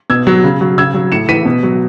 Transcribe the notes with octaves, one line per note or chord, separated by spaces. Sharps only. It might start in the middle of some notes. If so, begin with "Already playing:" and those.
B2 E6 G#6
F#3
C#3
F#3
C#3 E6 G#6
F#3
A2 C#7 E7
E3 B6 D#7
B2
F#3